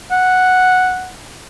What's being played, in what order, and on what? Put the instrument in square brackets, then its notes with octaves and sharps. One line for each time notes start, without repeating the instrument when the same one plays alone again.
[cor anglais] F#5